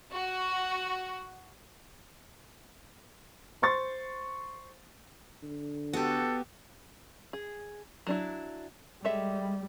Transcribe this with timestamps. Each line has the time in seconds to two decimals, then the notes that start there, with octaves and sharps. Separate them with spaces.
0.13 F#4
3.62 C5 C6 C#6 A6
5.43 D3
5.93 B3 F#4 G4 A4
7.33 G#4
8.07 F#3 D4 E4
9.05 G3 G#3 A4 E5